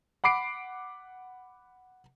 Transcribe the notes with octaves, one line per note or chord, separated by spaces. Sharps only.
F#5 B5 D6 C7 D7